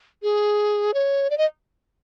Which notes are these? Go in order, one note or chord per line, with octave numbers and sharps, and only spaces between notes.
G#4
C#5
D5
D#5